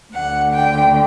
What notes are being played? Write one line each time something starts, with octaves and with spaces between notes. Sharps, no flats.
D2 D3 F#5
G5